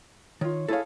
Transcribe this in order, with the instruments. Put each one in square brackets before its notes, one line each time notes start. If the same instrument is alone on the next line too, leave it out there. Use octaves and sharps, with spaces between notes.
[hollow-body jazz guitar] D#3 [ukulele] F4 C#5
[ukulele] E4 G#4 C#5 [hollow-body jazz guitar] A4 F5